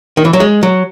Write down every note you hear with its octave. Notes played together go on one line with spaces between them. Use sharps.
D#3
E3
F#3
G#3
F#3